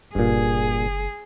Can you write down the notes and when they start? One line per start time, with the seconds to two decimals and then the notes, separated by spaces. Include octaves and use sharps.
0.15 F#1 G2 A#2 G#4